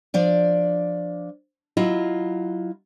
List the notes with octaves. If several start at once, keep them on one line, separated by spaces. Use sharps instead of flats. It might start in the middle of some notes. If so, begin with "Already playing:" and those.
F3 D4 D5
F#3 E4 F4 D#5